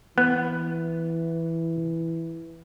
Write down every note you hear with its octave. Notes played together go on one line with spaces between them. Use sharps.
E3 B3